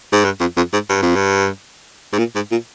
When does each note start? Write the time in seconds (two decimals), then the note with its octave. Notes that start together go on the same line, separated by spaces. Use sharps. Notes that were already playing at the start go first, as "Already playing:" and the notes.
0.12 G#2
0.24 G2
0.40 F2
0.57 F2
0.73 G#2
0.89 G2
1.02 F2
1.15 G2
2.13 G#2
2.18 A#2
2.35 G#2
2.51 A#2